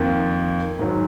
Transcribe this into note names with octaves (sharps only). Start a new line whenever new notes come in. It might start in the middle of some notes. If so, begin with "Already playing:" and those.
Already playing: F2 D#3 A#3
G#2 D#3 F#3